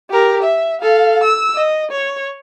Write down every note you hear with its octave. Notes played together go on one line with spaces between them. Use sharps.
G4 A#4
E5
A4 F5
E6
D#5
C#5